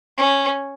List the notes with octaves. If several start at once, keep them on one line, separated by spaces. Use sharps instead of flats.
C#4